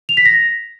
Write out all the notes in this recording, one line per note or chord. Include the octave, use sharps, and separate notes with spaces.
F7
B6
A#6